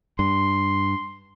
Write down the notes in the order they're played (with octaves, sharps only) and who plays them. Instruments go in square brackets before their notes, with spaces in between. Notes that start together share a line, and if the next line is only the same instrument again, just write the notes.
[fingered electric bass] G2 [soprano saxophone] C6